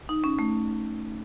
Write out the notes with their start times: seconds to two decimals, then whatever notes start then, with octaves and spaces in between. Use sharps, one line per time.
0.09 D#4
0.24 C#4
0.39 A3